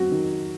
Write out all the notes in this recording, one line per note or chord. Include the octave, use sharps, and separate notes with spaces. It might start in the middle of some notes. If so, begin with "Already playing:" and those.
Already playing: F#3 C4 F#4
D#3